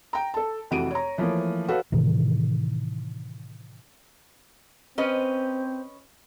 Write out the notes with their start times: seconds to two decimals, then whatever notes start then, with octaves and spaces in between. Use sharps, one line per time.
0.13 G5 A#5
0.34 A4 A5
0.71 F1 F2 E3 F#4 D7 D#7
0.91 C#5 A#5
1.18 E3 F3 A3 A#3 C#5
1.68 F#4 A4 B4 C#5 F5
1.92 A2 C3 D#3 E3
4.98 C4 C#4 B4 C5 D#5